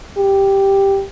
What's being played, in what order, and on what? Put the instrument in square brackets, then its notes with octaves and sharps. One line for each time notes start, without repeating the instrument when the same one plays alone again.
[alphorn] G4